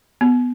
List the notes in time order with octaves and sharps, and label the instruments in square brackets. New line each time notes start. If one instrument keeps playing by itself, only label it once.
[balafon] B3